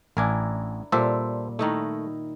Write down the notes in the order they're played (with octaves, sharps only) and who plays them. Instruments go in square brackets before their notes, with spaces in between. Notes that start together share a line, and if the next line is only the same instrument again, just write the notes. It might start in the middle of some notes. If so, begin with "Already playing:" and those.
[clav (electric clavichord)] A1 G#5 [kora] D4 E4 A#4
[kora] A#2 G3 [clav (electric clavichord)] A4 C5 E5
[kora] D#3 D#4 E4 [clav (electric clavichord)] A3